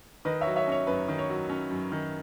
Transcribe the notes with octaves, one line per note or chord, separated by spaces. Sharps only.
D#3 B4 D#5
C#5 E5
F#3
C#5 E5
C#4 C#5
F#2 B4
D#3
C#5
F#3
C#4
F#2
D#3